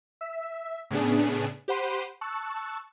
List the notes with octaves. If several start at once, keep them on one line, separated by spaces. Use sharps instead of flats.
E5
A2 C#3 B3 D4 G#4
G4 C5 F#5 B5 C6 D#7
A5 C#6 E6 F#6